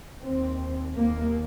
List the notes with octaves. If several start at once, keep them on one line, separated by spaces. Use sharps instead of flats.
D#2 C4
D#2 A#3